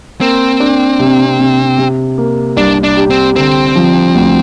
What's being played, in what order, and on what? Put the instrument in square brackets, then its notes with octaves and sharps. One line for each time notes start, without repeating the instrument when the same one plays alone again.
[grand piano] A#3 [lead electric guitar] C4
[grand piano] D4
C3
C3
C3
A#3
[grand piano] C2 [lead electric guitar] D4
[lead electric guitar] D4
[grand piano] G4
[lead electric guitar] C4
[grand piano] D3 [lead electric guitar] C4
[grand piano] F3
D2